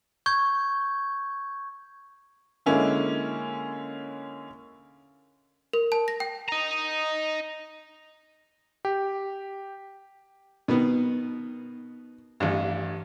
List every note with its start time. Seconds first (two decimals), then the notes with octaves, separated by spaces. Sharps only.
0.26 C#6 G6 G#6
2.66 D3 G#3 A#3 C#4 E4
5.73 A#4
5.92 A5
6.08 A#6
6.20 G5
6.49 D#5 A#5
8.85 G4
10.68 B2 D#3 B3
12.40 A1 G2